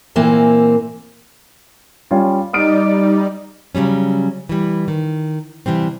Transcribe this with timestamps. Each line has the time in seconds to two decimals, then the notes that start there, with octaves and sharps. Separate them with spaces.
0.16 A#2 E3 A#3 C4
2.11 G3 C#4 F4
2.53 G3 D#4 D5 D#6 F6 D7
3.75 C#3 F#3 G3 C#4
4.49 E3 G3
4.88 D#3
5.66 C3 E3 G3 C4